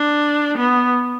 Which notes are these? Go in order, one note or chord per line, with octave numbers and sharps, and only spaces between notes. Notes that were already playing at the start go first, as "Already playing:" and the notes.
Already playing: D4
B3